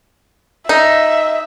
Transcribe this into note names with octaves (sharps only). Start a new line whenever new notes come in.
D#4 E5